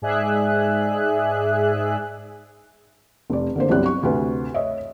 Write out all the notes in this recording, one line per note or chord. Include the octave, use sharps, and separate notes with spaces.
G#2 G#4 D5 E5 F#6
F1 D5
D3 A#3 C5
G1 C2 F#3 G3 D5 F#6
C#6
D2 C3 B4
C#5 D#5 E5